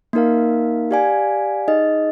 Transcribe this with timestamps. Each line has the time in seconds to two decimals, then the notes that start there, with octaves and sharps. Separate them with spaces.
0.13 A#3 D#4 A#4 F5
0.91 G4 D5 F5 G#5
1.68 D#4 G#4 D#5